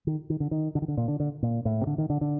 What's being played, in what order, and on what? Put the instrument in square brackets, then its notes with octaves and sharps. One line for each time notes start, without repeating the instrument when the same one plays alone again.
[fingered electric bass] D#3
D#3
D3
D#3
D3
D#3
D3
A#2
D3
D3
A#2
A2
C3
D3
D#3
D3
D3